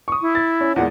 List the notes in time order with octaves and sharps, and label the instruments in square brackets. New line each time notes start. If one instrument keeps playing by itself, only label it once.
[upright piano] C#6 D#6
[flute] E4
[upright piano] A6
C#4
[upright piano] E2 A#2 G#3 [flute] F#5